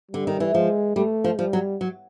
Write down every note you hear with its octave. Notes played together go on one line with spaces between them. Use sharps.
D3 G3
D#3
E3
F3 G#3
G3 A3
F3
F3 G3
F#3
F#3